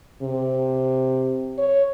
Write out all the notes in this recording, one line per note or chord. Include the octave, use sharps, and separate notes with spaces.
C3
C#5